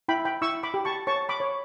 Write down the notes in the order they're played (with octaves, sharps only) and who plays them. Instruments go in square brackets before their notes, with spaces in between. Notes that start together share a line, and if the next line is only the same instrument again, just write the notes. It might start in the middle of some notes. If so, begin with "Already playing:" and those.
[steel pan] E4 G5 B5
G5 B5
E4 C#6 E6
B5 D6
G4
A5 C#6
C#5 A5 C#6
B5 D6
C#5